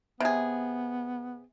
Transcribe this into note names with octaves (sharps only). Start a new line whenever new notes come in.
C3 B3 G#4